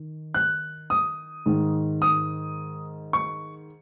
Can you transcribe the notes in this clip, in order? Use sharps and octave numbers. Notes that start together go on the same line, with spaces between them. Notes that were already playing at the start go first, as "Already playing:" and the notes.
Already playing: D#3
F#6
D#6
G#2 D#3
D#6
C#6